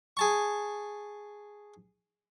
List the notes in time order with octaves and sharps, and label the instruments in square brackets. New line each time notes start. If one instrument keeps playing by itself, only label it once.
[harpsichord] G#4 A5 C#6